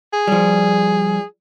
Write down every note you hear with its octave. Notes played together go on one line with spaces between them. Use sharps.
G#4
F3 G3